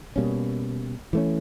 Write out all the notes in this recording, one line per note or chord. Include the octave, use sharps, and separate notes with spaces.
B2 G3 A#3 C#4
E3 A3 C#4